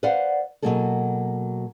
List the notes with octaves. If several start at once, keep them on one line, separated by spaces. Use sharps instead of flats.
B4 C5 D5 F5 F#5
B2 D#3 F#3 A#3 G#4 A4